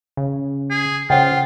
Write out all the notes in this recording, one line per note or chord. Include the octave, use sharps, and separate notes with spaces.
C#3
G#4
C#3 F4 C5 F#5 G5